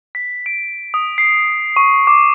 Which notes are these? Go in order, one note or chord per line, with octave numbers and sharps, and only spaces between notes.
B6
D7
D#6
C7
C#6
D6